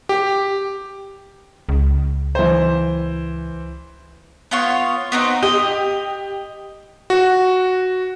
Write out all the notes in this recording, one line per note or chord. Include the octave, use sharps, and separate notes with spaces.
G4
C#2
E3 C5
B3 F4 C#5
B3 C4 D#4
G4 D#5
F#4